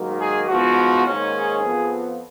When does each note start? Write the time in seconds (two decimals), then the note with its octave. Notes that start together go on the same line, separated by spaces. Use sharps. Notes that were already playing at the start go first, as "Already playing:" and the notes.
Already playing: G#2 D#3 F#3 A#3
0.21 G#4
0.48 G#2 F3 B3 F#4
1.06 G#2 D#3 A#3 C#4
1.35 G#4
1.63 F2 F3 B3